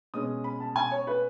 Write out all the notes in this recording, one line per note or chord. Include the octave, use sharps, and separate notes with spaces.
B2 G#3 C#4 D#6
B5
A5
G#5
C#5
B4